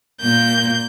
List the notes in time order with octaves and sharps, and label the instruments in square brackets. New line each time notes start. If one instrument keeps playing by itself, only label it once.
[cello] A#2 A#3 [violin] G6